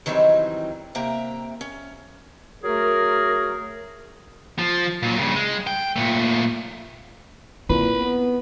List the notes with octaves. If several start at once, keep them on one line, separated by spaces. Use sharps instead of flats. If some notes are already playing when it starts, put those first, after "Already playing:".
D#3 E3 F#3 G3 C4 D#4
C3 A#3 E5 G5 A#5
C#4
F#3 A3 G#4 A#4
F3
A#2 F#3
G2 C#3
G#3
G5
A#2 A3
A#2 C4 E4 B4
B3